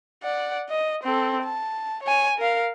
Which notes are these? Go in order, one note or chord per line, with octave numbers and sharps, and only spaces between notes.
D5 F#5
D#5
C4 A4
A5
C#5 G#5
A#4 F5